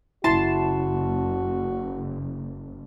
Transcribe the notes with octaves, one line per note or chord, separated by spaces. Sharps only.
F#1 E4 F#4 A5 C6